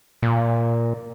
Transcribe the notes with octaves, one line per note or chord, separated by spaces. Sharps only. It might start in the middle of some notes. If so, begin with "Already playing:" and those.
A#2